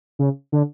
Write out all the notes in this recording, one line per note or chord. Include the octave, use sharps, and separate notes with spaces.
C#3
D3